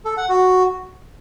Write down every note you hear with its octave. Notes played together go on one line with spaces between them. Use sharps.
A4
F#5
F#4